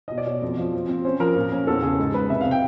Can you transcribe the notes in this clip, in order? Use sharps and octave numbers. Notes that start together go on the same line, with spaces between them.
B2 D#5
D5
B2 C#5
F2
F3
C4
C4
C#4 C5
F3 A#4
A#2
C#4
E2 A4
C#3 G#4
G#2
G#3 B4
C3 E5
F5
C3
G5